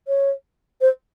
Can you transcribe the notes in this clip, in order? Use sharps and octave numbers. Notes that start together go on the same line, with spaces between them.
C#5
C5